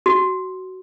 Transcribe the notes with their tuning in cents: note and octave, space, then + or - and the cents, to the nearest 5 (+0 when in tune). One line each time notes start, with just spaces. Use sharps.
F#4 +15